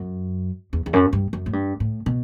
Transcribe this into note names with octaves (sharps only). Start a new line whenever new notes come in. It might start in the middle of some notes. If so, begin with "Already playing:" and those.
Already playing: F#2
E2
E2
F#2
G2
F#2
A2
G2
A2
B2